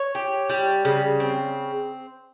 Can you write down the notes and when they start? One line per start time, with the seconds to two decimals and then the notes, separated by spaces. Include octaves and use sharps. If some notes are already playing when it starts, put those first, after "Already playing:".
Already playing: C#5
0.15 G4
0.49 G3
0.85 C#3
1.20 C4